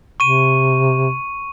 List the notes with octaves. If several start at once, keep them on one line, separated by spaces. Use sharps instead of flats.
C3 C#6 D#7